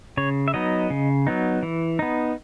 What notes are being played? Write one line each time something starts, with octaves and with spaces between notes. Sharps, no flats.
C#3 C#5
E5
F#3 B3 D#4 D#5
C#3
F#3 B3 D#4
E3
B3 D#4